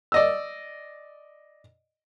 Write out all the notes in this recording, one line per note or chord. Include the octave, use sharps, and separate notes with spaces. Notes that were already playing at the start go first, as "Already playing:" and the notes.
D5 D#5 E6